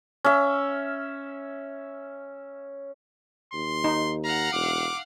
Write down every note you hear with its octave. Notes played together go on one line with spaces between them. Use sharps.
C#4 E5
D#2 C6
D#4
F5 F#5 A#5
E1 D6